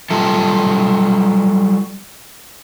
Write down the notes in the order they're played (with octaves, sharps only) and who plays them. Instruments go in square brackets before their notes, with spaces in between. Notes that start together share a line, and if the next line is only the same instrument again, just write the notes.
[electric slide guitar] F#3 G3 F4 A4 E5 A5